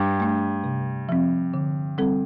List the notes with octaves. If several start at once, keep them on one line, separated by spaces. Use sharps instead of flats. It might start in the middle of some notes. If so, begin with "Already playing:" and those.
Already playing: G2
A3 D4
C3
F3 C4
D3
G3 C4 A4